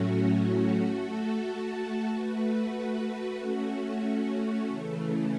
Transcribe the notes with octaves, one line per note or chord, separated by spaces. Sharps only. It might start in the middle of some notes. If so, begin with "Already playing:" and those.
Already playing: A2 F#3 A3 C#4 F#4
A3 F#4 A4
A3 F#4 B4
A3 C#4 F#4
C#3 E3 A3